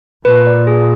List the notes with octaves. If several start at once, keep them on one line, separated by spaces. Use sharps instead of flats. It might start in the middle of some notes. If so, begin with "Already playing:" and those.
A#2 B4
D5
G#4